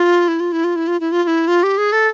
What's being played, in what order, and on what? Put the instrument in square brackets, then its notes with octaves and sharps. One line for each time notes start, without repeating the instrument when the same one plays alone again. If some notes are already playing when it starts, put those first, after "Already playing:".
Already playing: [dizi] F4
E4
F4
E4
F4
E4
F4
E4
F4
F4
E4
F4
G4
G#4
A4